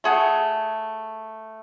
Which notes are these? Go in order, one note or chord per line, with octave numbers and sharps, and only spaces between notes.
A3 G#4 F#5